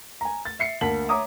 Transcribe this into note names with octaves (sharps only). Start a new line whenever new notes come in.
G#5 A#5
A6
E5 C7 C#7
D2 A#3 A5 B6 F#7
C#5 E5 A#5 D6 D#6